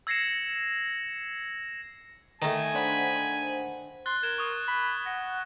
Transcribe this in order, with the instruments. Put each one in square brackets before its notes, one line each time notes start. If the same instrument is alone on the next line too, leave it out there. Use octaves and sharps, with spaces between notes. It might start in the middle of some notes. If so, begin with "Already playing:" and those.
[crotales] E6 G#6 A#6 C7 C#7 E7
[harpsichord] D#3 A3 [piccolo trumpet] G#5 [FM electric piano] A#5
[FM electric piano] D4 C5 F#5 [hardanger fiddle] B5
[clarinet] C6 [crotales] F#6 A6 G7
[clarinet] A#4 [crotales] G#6 E7 G7
[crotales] C#6 D#6
[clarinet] B5
[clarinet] F#5 [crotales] A#6